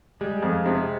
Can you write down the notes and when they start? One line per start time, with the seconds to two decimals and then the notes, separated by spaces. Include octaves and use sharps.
0.21 G3 G#3
0.42 F2
0.66 C3